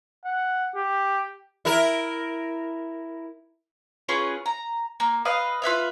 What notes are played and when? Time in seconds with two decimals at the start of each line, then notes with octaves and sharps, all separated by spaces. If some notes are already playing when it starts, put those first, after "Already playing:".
0.25 F#5
0.75 G4
1.65 E4 A#4
4.09 C#4 F4 G#4 B4
4.46 A#5
5.00 A#3
5.25 B4 D#5 F5
5.62 F4 B4 E5 F5